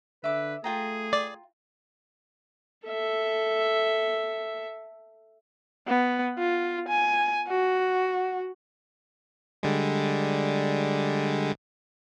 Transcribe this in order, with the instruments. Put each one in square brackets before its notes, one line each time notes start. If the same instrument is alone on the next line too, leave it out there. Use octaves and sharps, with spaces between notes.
[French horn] D3 [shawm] B4 [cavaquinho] E5 D6
[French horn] A3 [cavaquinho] F4 G5 A#5 [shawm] G#4
[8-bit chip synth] D5
[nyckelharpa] A4 E5
[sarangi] B3
F4
G#5
F#4
[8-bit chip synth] D3 G3 G#3